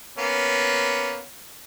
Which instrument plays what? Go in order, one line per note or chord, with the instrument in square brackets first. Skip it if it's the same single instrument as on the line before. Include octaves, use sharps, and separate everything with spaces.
[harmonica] A#3 B3 C#4